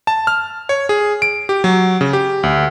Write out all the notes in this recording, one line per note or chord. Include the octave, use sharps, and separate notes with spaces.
A5
F6
C#5
G#4
D7
G4
F#3
C#3
G4
D2